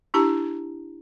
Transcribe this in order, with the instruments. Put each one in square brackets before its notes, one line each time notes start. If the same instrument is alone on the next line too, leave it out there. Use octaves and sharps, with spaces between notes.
[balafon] D4 E4 G4 A5 A#5